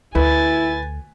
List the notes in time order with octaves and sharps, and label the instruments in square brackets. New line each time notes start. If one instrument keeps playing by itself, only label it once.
[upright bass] D2 [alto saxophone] E4 [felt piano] B4 [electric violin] G#5 A6